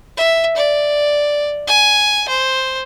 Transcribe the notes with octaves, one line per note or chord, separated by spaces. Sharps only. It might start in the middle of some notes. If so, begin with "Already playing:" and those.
E5
D5
G#5
C5